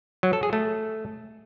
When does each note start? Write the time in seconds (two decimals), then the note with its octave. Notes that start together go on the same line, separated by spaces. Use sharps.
0.23 F#3
0.33 A4
0.43 G#4
0.53 A3